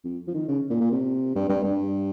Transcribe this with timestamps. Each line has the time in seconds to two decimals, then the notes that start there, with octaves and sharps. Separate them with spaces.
0.04 F2
0.28 F3
0.34 D#3
0.48 C#3
0.70 A#2
0.80 A#2
0.92 C3
1.35 G2
1.49 G2
1.64 G2